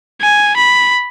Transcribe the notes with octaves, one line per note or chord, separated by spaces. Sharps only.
G#5
B5